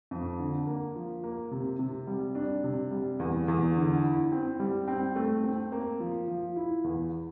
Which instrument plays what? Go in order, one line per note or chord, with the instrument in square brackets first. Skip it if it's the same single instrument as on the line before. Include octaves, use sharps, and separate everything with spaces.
[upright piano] F2
D3
A#3
F3
A#3
C3
C3
G3
D4
C3
G3
E2
E2
D3
E4
C4
G3
C4
A3
C4
A#3
F3
F3
E4
E2